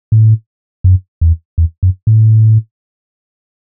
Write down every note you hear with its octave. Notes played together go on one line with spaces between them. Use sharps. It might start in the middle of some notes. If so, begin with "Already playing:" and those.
A2
F#2
E2
E2
F#2
A2